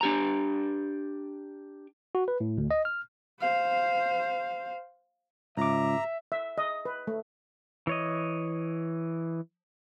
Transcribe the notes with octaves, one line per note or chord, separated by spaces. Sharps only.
D4 G4 A#5
F#4
B4
A2
D2
D#5
F6
C5 F5
C#2 G#2 E5 A#5 D6
E5
D#5
B4
A3
E3 C#5 D#5